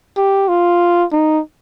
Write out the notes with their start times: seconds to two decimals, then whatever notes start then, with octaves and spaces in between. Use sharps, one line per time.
0.17 G4
0.48 F4
1.12 D#4